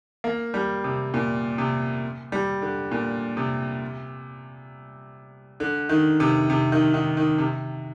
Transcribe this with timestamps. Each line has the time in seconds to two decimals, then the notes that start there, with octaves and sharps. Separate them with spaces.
0.24 A#3
0.54 G3
0.84 C3
1.14 A#2
1.58 C3
2.32 G3
2.62 D3
2.91 A#2
3.37 C3
5.60 D3
5.89 D#3
6.20 C3
6.50 C3
6.72 D#3
6.94 D#3
7.17 D#3
7.38 C3